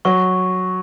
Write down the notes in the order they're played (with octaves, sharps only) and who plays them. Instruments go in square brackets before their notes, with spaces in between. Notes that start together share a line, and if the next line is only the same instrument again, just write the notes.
[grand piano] F#3 [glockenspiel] C#6